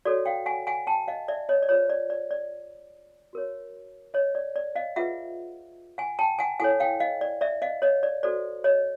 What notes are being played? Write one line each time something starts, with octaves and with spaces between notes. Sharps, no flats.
F#4 A4 C#5 D5
F5 G5
F#5 G#5
F#5 G#5
G5 A5
D#5 F5
D5 E5
C#5 D#5
D5
F4 G#4 C5 C#5
D5
D5
D5
F#4 A#4 C#5
C#5 D#5
D5
D5
D#5 F5
F4 G#4 B4 E5 F#5
F#5 G#5
G5 A5
F#5 G#5
E4 A4 C#5 F#5 G#5
F5 G5
D#5 F5
D5
D5 E5
D#5 F5
C#5 D#5
D5
F#4 A4 C5 D5
C#5 D#5